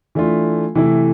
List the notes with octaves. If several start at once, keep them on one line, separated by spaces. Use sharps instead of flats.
E3 A3 D4 F4
C3 E3 A3 E4